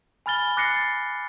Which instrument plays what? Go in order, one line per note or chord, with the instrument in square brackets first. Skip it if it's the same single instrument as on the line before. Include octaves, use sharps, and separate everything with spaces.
[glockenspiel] G#5 B5 F6 A6 G7
D6 F#6 A6 A#6 C7 C#7
A6